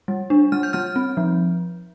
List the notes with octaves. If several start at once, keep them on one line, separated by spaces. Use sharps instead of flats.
G3
D4
G3 F6
G6
G3 F6
C4
F3